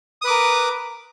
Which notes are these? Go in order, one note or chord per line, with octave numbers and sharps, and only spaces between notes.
A#4 B4 D6 D#6